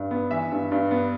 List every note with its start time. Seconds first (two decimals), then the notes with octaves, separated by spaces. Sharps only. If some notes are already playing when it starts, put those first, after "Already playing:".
Already playing: G2
0.11 B3
0.31 E3 E5
0.51 G2
0.72 G2
0.91 B3